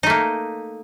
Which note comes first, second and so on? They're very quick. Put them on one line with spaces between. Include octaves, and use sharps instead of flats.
D#4 A3 A#3